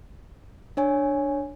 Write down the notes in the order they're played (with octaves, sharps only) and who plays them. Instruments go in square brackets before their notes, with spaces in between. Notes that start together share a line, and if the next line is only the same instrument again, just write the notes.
[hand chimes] D4 C#5 G#5